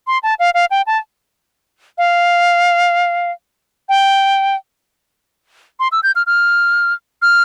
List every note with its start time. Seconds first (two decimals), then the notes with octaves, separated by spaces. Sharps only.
0.07 C6
0.23 A5
0.39 F5
0.54 F5
0.71 G5
0.87 A5
1.98 F5
3.89 G5
5.80 C6
5.92 E6
6.03 G6
6.16 F6
6.27 F6
7.22 F6